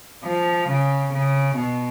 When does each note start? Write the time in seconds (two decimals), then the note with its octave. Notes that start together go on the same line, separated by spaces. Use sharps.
0.24 F3
0.69 C#3
1.13 C#3
1.56 B2